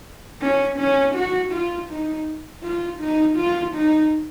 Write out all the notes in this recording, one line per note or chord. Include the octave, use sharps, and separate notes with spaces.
C#4
C#4
F#4
F4
D#4
F4
D#4
F4
D#4